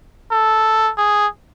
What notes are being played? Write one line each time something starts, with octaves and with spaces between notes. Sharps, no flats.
A4
G#4